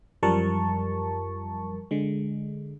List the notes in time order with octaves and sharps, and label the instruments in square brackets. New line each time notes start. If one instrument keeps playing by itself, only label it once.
[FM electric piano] F#2 F3 G3 A#4 A5 C#6
D3 G#3